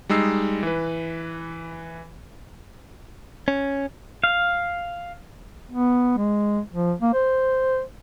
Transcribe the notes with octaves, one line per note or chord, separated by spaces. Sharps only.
G3 G#3 D#4 E6 C7
E3 B4
C#4
F5
B3
G#3
F3
A#3
C5